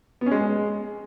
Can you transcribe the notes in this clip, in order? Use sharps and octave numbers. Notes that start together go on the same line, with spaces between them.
B3
C#4
G#3